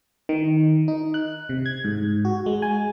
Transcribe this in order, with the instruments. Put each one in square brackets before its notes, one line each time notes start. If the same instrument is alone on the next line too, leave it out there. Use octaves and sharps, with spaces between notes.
[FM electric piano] D#3
D#4
F#6
C3
G#6
G#2
F#4
G#3
G#5